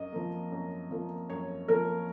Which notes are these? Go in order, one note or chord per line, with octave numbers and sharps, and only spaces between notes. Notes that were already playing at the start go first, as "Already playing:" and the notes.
Already playing: F#2 D#5
F3 A#3
F#2
F3 A#3
F#2 C#5
F3 A#3 A#4